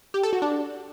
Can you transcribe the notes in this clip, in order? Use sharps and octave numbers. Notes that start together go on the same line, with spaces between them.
G4
A4
F#4
D4